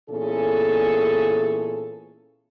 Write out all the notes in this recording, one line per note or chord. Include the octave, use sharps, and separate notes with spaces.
A#2 E3 B3 C#4 G#4 A4